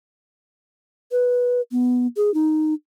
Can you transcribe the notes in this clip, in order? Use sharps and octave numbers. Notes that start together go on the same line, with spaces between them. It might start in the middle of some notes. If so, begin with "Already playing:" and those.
B4
B3
G#4
D#4